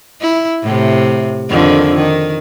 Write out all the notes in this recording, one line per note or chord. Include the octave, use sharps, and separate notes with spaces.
E4
A2 C3
F2 D3 D#3
D#3